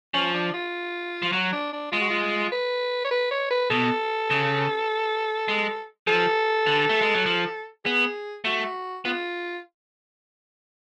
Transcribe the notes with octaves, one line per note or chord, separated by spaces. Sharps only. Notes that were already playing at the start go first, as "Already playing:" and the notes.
F3 C#4
D4
F4
F3 F4
F#3 F#4
D4
D4
G#3 F4
F#4
F4
B4
C#5
B4
C#5
B4
B2 A4
C#3
G#3
F3 A4
D3
A3
G#3
F#3
F3
B3 G#4
A3 F#4
B3 F4